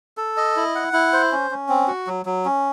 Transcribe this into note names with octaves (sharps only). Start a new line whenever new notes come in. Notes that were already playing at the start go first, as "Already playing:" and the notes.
A4
D#5
E4
F#5
E4
C5
C#4
C#4
C4
F#4
F#3
F#3
C#4